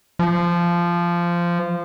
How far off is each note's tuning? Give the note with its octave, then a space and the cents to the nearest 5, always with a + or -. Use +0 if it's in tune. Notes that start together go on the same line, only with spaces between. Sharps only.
F3 -15